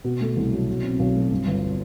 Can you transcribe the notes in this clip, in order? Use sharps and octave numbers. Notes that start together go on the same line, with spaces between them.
B2
A3
C2
F#3
B2
C4
B1
A3
G2
G1